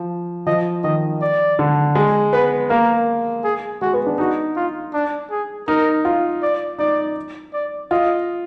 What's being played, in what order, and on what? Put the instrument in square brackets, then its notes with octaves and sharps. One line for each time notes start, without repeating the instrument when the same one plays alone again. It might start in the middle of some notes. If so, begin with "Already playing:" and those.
Already playing: [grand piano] F3
[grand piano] F3 [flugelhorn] D#5
[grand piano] D#3 [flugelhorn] D#5
[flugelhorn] D5
[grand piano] D3
G#3
[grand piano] B3 [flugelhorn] B4
[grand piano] A#3 [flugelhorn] A#4
[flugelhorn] G#4
[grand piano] G#3 [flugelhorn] F#4
[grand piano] B3
D4
[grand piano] D#4 [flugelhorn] F#4
[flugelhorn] F4
D4
G#4
[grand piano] D#4 [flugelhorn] A#4
[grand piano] F4
[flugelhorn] D5
[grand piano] D#4 [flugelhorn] D5
[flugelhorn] D5
[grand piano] F4 [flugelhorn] D#5